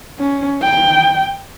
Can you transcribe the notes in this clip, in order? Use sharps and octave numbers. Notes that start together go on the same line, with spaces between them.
C#4
G5